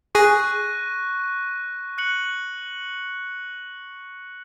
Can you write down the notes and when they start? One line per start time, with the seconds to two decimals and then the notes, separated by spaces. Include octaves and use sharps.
0.15 G#4 C#6 F#6 A#6 D#7
1.98 F#6 C#7 F#7